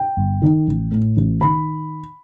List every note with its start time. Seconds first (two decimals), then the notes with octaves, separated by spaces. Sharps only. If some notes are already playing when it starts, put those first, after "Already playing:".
Already playing: G5
0.17 G1
0.42 D#3
0.67 A1
0.92 A2
1.17 A1
1.41 D#3 B5